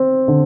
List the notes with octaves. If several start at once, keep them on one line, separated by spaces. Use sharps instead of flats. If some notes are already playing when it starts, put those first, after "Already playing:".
Already playing: C4
D3